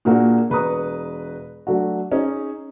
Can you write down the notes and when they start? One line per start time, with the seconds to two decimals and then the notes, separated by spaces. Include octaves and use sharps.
0.05 A#2 A#3 D4 F#4 G#4
0.50 E1 B4 A#5 C#6 D#6
1.67 F#3 A3 D4 F#4
2.12 C#4 D#4 G#4